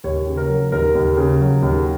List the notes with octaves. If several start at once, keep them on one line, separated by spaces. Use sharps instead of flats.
D#2 C#5
C#3
A#4
F#3
D#2 A#4
D#2
C#3
F#3
D#2